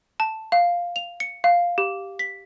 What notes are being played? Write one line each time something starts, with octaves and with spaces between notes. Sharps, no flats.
A5
F5
F7
C#7
F5
G4
B6